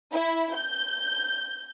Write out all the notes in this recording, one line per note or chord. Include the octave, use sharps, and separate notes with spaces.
E4
G6